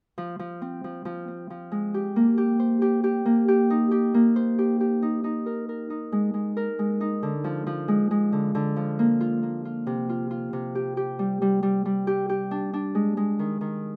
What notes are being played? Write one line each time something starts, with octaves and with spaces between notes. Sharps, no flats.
F3
F3
C4
F3
F3
C4
F3
G#3
G4
A#3
G4
C5
G4
G4
A#3
G4
D#4
G4
A#3
C5
G4
G4
D#4
D#4
A#4
A#4
D#4
G#3
G#3
A#4
G#3
D#4
D3
F3
F3
G#3
G#3
D3
D3
F3
A#3
F4
A#3
F4
C3
F4
F4
C3
G4
G4
G3
G3
G3
G3
G4
G4
D4
D4
G#3
G#3
D#3
D#3